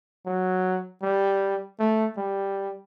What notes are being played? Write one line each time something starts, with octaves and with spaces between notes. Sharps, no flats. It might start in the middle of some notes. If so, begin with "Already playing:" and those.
F#3
G3
A3
G3